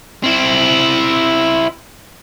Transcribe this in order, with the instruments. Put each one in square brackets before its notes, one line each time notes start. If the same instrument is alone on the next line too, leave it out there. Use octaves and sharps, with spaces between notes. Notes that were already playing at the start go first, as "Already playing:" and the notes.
[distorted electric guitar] C4 E4